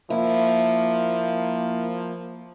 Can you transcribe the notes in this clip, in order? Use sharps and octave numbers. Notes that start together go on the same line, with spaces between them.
F3 A#3 E4